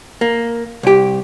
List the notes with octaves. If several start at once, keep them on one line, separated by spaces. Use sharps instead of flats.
A#3
C2 G4